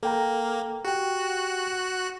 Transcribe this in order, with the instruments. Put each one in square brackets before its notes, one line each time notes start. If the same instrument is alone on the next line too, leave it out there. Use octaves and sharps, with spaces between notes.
[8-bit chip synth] A#3 [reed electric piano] A4 G5 A#5
[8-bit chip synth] F#4 F#6 [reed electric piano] G4 G5